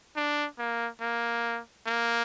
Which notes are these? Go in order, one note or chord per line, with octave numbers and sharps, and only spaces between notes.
D4
A#3
A#3
A#3